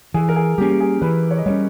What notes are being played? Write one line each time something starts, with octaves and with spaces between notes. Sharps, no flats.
E3 G#4
A#4
G#4
G3 A#3 C#4 G4
G4
G#4
E3 B4
C#5
D#5
G3 A#3 C#4 C#5